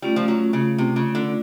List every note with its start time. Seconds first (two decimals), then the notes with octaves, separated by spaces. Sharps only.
0.02 G3 A3 C#4 F4
0.16 F3
0.28 F#3
0.53 C#3
0.78 C3
0.96 C#3
1.15 D3